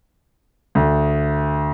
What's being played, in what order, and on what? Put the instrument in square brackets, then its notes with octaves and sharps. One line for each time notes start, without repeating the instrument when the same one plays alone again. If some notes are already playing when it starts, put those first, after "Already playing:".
[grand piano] D2